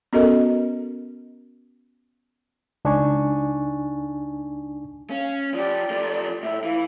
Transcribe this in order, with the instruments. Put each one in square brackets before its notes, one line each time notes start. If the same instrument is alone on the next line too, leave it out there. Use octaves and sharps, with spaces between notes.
[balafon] B3 C#4 F#4 A4 A#4 D#5
[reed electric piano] C#2 D4 D#4 G#5 C#6
[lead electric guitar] C#4 [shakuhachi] F5
[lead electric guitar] F3 G4 [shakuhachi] D5
[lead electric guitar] F3 A3
[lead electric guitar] A2 [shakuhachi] E5
[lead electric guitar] E3 [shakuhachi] F5